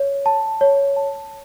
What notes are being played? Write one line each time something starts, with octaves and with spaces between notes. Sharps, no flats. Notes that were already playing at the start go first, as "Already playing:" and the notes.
Already playing: C#5
A5
C#5
A5